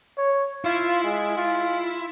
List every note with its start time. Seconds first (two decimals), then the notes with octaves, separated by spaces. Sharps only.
0.18 C#5
0.65 E4 F4
1.04 G#3
1.37 F4